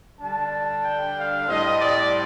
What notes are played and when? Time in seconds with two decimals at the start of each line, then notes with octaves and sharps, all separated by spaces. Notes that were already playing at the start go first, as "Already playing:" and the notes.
0.20 D3 G3 D4 A5
0.84 G5
1.17 F5
1.48 A2 G3 C4 D#5
1.81 D5